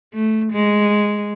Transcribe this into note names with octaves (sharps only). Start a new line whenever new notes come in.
A3
G#3